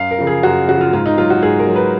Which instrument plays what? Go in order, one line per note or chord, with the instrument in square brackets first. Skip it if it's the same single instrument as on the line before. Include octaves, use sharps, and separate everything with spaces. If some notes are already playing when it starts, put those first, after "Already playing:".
Already playing: [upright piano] F#2 F5
A#4
C#3 F3
G#4
F#2 F#4
C#3 F3 F#4
F4
G#2 F4
D#4
F#3 F4
F#4
G#2 G#4
A#4
F#3
B4